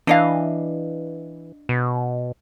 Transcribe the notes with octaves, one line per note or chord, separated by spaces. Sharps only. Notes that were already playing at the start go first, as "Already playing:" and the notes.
E3 D4 D#5 F5
B2